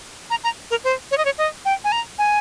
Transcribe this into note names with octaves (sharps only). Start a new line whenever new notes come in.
A#5
A#5
A#4
C5
C#5
D#5
C#5
D#5
G5
G#5
A#5
G#5